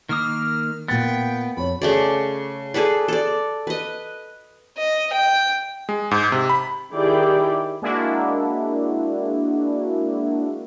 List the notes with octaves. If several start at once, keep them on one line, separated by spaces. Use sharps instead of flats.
D#3 A#3 D#6 F6
A#2 B3 G5 A6
F2 C#5 B5
C#3 A3 D5
G#4 A4 B4 D5
A4 D5
B4 D#5
D#5
G5
G#3
G#2
C3
B5
D#3 E4 G4 G#4 D5 G5
G#3 A#3 D4 E4 F#4